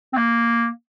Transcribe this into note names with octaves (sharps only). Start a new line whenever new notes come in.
C4
A#3